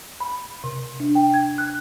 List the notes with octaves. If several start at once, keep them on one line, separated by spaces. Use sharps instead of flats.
B5
C3
D4
G5
G#6
F#6